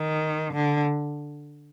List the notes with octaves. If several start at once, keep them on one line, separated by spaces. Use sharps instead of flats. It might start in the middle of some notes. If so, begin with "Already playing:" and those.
Already playing: D#3
D3